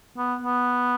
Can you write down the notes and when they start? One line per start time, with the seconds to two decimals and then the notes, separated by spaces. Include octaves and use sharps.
0.17 B3
0.42 B3